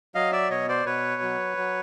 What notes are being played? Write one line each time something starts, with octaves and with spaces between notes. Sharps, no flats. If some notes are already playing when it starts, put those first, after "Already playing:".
F#3 D#5 F5
D5 E5
B2 C#5 D#5
C5 D5
B2 B4 C#5
F#3
F#3